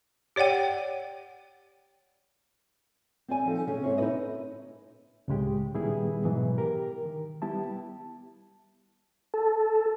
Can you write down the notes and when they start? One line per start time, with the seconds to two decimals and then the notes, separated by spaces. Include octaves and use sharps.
0.36 G4 C#5 D5 F#5 G5
3.28 C4 D5 G#5
3.46 F3 D#4 A4
3.67 C#3 C#4 G#4
3.84 G#2 C4 E4 C#5
3.98 D#4 E4 F#4 A4 B4 D#5
5.28 C#2 A2 C#3 G#3 G4
5.74 A#2 D#3 G3 B3 E4 G#4
6.24 G#2 B2 E3 F#3
6.58 G4 A#4
7.05 D#3
7.42 G3 B3 E4 G4 A5
9.34 A4